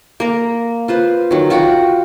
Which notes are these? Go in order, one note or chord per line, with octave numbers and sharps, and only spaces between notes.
A#3 A#5
F4 B4 C5
D#3 F#3
F4 F#4 F#5 G5